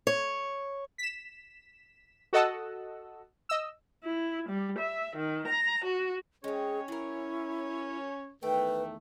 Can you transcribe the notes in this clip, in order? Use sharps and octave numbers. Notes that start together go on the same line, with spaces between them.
C#5
B6 E7
F#4 A4 D#5 F#5 A5 E6
D#5 E6
E4
G3
E5
D#3
A#5
F#4
G#3 C4 C#4 G#4 C#5
F#3 E4 A#4
E2 D#3 A3 A4 B4 G5